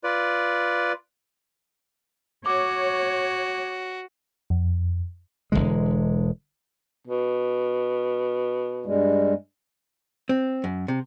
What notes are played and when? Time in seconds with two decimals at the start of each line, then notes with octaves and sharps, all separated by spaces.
0.04 F4 B4 D5
2.46 F#4 C#5 D6
4.50 F2
5.52 E1 E2 D3 G#3
7.07 B2
8.86 G2 G3 G#3
10.29 C4
10.64 F#2
10.88 C3